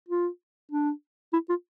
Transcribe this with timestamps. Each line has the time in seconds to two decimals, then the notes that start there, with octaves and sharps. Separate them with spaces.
0.09 F4
0.71 D4
1.33 E4
1.49 F4